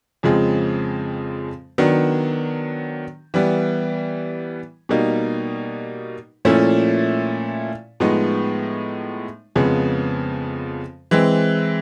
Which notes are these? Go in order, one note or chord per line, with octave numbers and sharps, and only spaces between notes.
F2 C#3 F3 G#3 C4
D#3 F#3 B3 D4
E3 G3 B3
B2 G3 A#3 D#4
A#2 F3 A3 C#4 E4
A2 F3 G#3 B3 D#4
F2 C#3 F3 G#3 B3
E3 G#3 C4